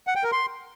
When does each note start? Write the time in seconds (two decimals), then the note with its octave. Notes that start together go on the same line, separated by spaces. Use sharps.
0.07 F#5
0.15 G5
0.24 A#4
0.32 C6